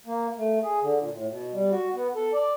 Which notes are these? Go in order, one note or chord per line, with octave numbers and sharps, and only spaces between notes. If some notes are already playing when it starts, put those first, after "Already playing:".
A#3
A3
G#4
D3
A#2
A2
B2
G3
F#4
B3
A4
D5